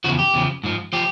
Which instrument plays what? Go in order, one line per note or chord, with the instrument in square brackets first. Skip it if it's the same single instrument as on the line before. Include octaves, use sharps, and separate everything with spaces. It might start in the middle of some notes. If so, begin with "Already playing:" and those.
[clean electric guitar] E2 C#3 F3 F#4
G4
E2 C#3 F3
G#2 F3
F3 G4